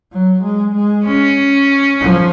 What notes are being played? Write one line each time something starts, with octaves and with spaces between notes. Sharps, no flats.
F#3
G#3
G#3
C#4
F3